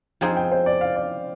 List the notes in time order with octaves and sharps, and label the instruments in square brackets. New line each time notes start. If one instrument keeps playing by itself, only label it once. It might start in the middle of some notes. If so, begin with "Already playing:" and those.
[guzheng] F3 C4 D#4 G#4 [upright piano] G5
[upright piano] G5
C5
D5
F5
D5